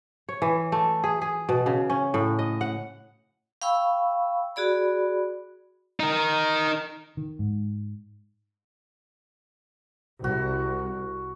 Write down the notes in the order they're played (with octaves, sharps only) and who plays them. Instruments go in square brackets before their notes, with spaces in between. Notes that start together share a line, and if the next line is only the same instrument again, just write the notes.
[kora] C#5
E3
A3
G#4
G#4
B2
C#3
C#4
A2
D#5
F#5
[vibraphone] F5 G5 B5 C#6 E6
F#4 G#4 D5 B5
[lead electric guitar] D#4 A#4
[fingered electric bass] D#3
G#2
[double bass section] C2 [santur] F#4